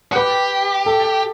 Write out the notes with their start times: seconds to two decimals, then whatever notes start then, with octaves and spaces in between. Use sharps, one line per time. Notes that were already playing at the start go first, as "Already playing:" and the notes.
0.12 F#4
0.16 G4 B4
0.86 A4